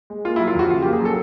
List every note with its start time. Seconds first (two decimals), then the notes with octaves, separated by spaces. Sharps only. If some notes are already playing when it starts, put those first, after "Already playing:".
0.10 G#3
0.25 A#3 F4
0.36 E4
0.40 F#3
0.47 F4
0.55 F2 F#4
0.70 C#3 F4
0.82 G4
0.85 A#3
0.93 G#4
1.01 F#3 A4